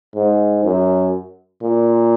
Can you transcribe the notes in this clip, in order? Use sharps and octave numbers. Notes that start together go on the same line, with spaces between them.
G#2
F#2
A#2